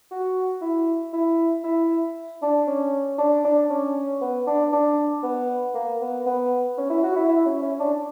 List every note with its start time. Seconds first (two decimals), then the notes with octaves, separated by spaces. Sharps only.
0.11 F#4
0.61 E4
1.13 E4
1.64 E4
2.42 D4
2.67 C#4
3.18 D4
3.45 D4
3.70 C#4
4.21 B3
4.47 D4
4.73 D4
5.23 B3
5.74 A#3
6.01 B3
6.26 B3
6.77 C#4
6.90 E4
7.03 F#4
7.16 E4
7.28 E4
7.45 C#4
7.62 C#4
7.80 D4